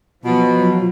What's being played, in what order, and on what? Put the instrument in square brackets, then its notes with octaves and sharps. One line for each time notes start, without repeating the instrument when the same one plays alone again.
[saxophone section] B2 [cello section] F3 F#3 [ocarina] F4